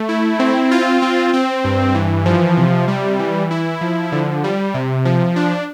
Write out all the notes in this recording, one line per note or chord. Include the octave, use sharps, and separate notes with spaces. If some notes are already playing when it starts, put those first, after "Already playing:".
Already playing: A3
E4
C4
F4
C4
C4
G2
E3
F3
C3
G3
E3
E4
F3
D3
G3
C3
F3
D4